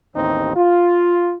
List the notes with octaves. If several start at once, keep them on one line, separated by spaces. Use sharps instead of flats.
A1 D#2 C4 D#4
F4